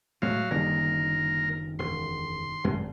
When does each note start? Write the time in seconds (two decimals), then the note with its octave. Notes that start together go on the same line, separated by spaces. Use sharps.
0.22 D2 A2 F#3 G#3 F5
0.51 F#1 D3 D#3 G3 A#3 A#4
1.79 E1 C6
2.64 G#1 F#2 G#3